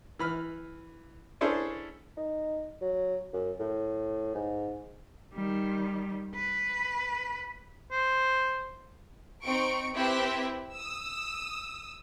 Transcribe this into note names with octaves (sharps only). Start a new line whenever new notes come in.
E3 B5 F6
C#4 D4 E4 G#4 A4 C5
D#4
F#3
F#2
A2
G#2
D#3 G3
B4
C5
C4 D#4 C#6 D7
C4 E4 G4 B4 E5
D#6 E6